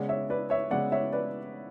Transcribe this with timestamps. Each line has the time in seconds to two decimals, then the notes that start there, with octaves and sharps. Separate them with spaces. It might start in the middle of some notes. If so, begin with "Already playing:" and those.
Already playing: C#3 G#3 B3 D5 F#5
0.09 C#5 E5
0.30 B4 D5
0.50 C#5 E5
0.71 C#3 G#3 B3 D5 F#5
0.92 C#5 E5
1.12 B4 D5